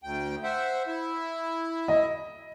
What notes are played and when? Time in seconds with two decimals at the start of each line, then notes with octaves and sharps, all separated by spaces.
0.03 D2 G5
0.44 C5 E5 F#5
0.87 E4 E5
1.88 D#5